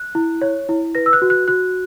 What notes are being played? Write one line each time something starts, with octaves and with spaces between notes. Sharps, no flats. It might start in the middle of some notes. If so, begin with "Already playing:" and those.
Already playing: F#6
E4
C#5
E4
B4 A#6
E6
F#6
F#4
F#6
F#4 F#6